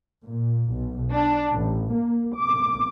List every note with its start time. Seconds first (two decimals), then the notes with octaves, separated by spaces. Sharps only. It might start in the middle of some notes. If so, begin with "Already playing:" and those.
0.24 A#2
0.72 B1
1.11 D4
1.52 A1
1.94 A#3
2.36 D6